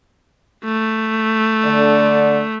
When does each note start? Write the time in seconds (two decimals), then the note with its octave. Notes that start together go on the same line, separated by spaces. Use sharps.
0.65 A3
1.65 D3 D5